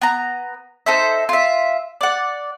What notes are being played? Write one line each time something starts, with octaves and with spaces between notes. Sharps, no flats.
B3 A#5
D#4 A4 C5 E5
F4 E5
D5 F#5